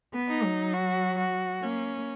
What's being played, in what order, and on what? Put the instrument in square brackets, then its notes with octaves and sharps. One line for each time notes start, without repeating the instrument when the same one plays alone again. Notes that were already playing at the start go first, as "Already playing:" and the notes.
[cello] B3
[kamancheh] D#4
[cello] F#3
[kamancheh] F#4
F#4
[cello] A#3 [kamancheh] C#4